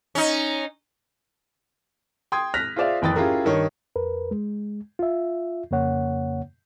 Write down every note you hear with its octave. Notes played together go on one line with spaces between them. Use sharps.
C#4 D#4
G5 C6 D#6 G#6
F6 F#6 A#6 B6 F7
F4 G#4 C5 D5 E5 F5
F#1 E3 G5 D#6 A6
C#4 E4 F4 G4 G#4 A#4
G2 D#3 C#5
F2 A#4 B4
G#3
F4 E5
F2 C#3 A#3 C#5 F#5